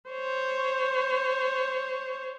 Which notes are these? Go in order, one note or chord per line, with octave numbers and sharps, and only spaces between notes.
C5 C#5